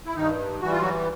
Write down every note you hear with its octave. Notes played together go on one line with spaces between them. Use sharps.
E4
G2 D#3 D#4
E3 G3 F#4
F4
F#3 F#4